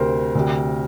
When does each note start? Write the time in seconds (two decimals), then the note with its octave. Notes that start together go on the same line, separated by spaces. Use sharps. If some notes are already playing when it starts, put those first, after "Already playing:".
Already playing: D2 C3 A#4 C5
0.35 D2 C3